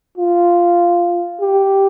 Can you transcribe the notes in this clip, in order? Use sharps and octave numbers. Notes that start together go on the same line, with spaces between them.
F4
G4